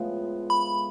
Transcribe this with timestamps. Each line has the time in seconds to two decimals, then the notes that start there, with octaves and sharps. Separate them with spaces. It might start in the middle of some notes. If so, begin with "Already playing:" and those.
Already playing: A2 F3 G#3 B3
0.50 B5